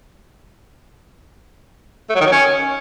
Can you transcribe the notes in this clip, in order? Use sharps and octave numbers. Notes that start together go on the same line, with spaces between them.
A3
F#3
D#3
F#3
C#4